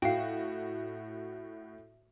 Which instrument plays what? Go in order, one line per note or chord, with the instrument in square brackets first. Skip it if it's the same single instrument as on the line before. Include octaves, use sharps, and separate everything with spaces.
[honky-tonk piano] A2 F#4 [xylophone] F5 G5